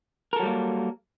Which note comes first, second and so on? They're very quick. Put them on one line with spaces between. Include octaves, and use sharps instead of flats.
A#4 A4 F#3 G3 A#3